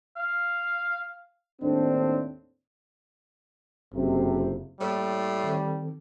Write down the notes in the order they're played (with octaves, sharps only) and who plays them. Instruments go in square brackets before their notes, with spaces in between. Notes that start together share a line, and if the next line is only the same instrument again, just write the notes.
[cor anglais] F5
[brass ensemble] D#2 A2 C4 D4
[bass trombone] F#1 [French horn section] F2 C3
[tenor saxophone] A2 [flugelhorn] G3 [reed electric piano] A#3 E4 C#5
[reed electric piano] D#3 C4 A4